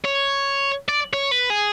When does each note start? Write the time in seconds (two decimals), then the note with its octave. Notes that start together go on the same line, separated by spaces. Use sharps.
0.04 C#5
0.89 D5
1.13 C#5
1.31 B4
1.50 G#4